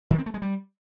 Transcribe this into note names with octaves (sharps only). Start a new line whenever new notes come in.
D#3
C4
A3
G#3
G3